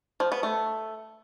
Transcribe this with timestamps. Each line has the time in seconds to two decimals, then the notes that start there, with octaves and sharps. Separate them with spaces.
0.20 F3
0.32 B3
0.43 A3